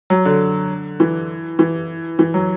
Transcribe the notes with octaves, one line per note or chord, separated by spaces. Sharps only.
F#3
D3
E3
E3
E3
F#3